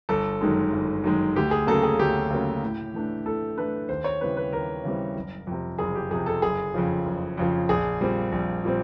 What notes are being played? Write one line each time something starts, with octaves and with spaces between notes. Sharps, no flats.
G1 A4
F#2 D#3 G#3
G1
F#2 D#3 G#3
D2 G4
G#4
C#3 F#3 A#3 C#4 A4
G#4
D2 G4
C#3 F#3 A#3 C#4
A2
E3 A3 D4
A2 A4
E3 A3 D4 B4
D#2 C5
C#5
C#3 E3 G3 C4 B4
B4
D#2 A#4
C#3 E3 G3 C4
F#1
F2 C3
F#1 G#4
G4
F2 C3 G#4
A4
F#1 G#4
F2 C#3 F3
F#1
F2 C#3 F3
A#1 G#4
A#2 G3 C4
A#1
A#2 G3 C4